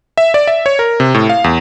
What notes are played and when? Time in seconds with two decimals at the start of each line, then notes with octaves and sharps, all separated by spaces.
0.18 E5
0.34 D5
0.47 E5
0.66 C#5
0.79 A#4
1.00 C3
1.14 A2
1.29 F5
1.44 E2